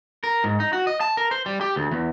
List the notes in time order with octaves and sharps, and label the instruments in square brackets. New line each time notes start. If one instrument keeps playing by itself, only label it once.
[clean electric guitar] A#4
G#2
D#4
F#4
D#5
A5
A#4
C5
G3
G4
D2
E2